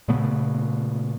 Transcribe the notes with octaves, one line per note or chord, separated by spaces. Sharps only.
A#2 C#3 A3 B3